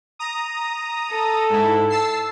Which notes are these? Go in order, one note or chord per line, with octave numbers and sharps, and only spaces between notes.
A#5 D#6
A4
G#2 E4
A5 E6 C7